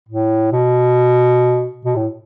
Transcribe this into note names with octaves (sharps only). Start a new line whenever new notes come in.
A2
B2
B2
A2